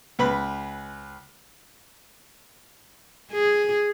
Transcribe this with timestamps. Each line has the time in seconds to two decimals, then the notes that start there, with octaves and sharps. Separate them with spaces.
0.19 C#2 B4 B5
3.31 G#4